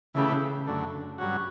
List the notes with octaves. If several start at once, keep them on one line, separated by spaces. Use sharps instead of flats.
C#3 E3 A3 E4 G4 B4
F#2 D3 A3
G2 F#3 C#4 F#4